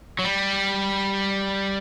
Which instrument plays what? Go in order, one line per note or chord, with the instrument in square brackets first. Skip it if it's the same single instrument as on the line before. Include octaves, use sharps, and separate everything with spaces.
[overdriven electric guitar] F#3
G3